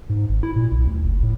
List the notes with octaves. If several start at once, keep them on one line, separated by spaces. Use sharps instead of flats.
G#2
G#1
E4
A#2
B1
D2
F#1
A2